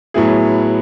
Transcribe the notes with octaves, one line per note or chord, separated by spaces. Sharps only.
A2 F#3 B3 E4 G#4